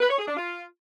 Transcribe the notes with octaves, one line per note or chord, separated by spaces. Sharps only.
B4
C#5
G#4
D4
F4